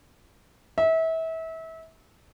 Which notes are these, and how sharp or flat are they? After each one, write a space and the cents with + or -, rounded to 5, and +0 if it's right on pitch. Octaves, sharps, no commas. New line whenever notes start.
E5 -30